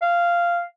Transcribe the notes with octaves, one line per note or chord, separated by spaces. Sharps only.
F5